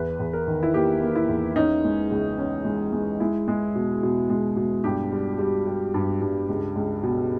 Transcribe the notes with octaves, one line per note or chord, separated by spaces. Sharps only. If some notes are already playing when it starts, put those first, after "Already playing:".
Already playing: E2 B4
E2
A#4
D#3
E4
A#3 G4
A#3
E4
E2
C#4 D#4
G#3
C#2
C#4
G#3
G#3
G#3 E4
G#3
B2
B2
G#3
B2
G2 G4
G3
G3
G3
G2
G2
C#2
C#2
B2